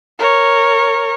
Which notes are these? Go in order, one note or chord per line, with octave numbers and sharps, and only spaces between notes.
A#4 C#5